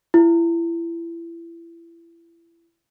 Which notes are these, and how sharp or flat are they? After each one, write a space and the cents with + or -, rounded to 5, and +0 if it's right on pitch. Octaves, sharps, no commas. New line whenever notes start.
E4 +30